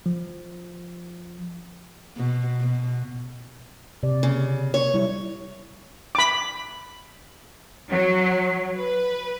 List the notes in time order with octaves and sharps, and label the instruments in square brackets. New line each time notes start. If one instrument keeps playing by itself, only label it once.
[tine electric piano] F3
[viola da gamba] B2
B2
[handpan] C3 D5
[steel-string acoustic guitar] C#3
C#5
[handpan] G3 E4
[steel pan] B5 D6
[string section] F#3
B4